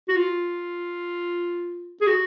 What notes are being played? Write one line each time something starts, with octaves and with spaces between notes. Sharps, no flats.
F#4
F4
G#4
F#4